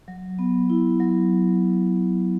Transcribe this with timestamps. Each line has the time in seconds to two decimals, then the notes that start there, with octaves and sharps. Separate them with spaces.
0.08 F#3
0.39 B3
0.70 E4
1.00 F#3